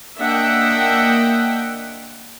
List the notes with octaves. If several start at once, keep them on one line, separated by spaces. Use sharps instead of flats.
A#3 D4 D#5 E5 F#5 G5